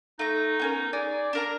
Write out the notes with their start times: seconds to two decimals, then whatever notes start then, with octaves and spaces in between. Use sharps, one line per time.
0.19 A3 D#4 A#5
0.59 B3 C#4 A#4
0.93 G#4 D5
1.33 D4 A#4 A#5